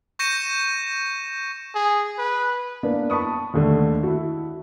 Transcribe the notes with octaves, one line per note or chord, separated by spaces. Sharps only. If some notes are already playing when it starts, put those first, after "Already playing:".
C#6 G6 A#6 C#7 D#7 E7
G#4
B4
A#3 B3 D4
A5 B5 C#6 D#6
D#2 D3 A3
E4 F#4